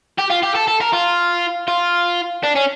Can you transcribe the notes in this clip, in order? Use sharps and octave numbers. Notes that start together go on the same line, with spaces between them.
G4
F4
G4
A4
A4
A#4
F4
F4
D4
C#4